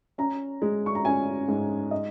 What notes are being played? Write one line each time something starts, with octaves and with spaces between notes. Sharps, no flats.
C#4 A#5
G#3
C#6
A#5
C#4 G#5
G#2
D#5